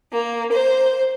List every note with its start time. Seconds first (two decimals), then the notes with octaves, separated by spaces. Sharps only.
0.13 A#3
0.52 C5